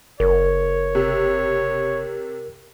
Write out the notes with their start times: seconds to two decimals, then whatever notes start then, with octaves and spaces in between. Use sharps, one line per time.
0.20 F#1 A#4 C#5
0.95 C3